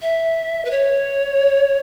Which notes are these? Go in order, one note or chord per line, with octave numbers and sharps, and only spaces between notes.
E5
B4
C#5